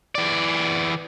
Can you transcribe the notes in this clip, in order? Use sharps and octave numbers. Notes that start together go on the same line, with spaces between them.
E3 D5